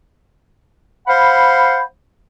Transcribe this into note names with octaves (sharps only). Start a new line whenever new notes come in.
C5 F5 F#5 B5